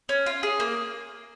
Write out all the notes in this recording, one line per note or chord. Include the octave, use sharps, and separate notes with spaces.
C#4
F4
G#4
A#3